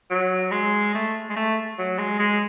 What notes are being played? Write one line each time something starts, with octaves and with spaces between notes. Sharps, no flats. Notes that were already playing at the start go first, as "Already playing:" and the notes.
F#3
G#3
A3
G#3
A3
F#3
G#3
G#3